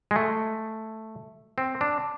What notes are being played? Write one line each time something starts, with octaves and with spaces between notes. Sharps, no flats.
G#3
A3
C4
D4